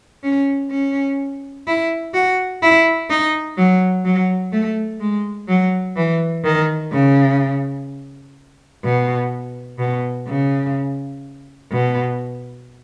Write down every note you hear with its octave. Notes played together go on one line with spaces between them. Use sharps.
C#4
C#4
E4
F#4
E4
D#4
F#3
F#3
A3
G#3
F#3
E3
D#3
C#3
B2
B2
C#3
B2